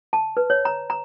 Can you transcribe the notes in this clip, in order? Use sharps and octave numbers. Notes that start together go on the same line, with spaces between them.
A5
B4
C#5
A#5
A#5